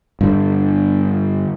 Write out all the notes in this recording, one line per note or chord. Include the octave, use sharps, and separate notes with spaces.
G2 D3